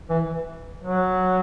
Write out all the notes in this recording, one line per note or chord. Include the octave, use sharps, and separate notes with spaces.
E3
F#3